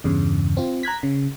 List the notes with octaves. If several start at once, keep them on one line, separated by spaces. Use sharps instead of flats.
E2 G2 C#3
C4 F4
A#5 F#6 G#6 B6
C#3